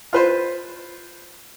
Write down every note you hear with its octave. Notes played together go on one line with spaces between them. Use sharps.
F4 B4 C5